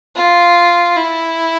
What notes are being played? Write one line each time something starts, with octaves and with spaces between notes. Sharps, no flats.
F4
E4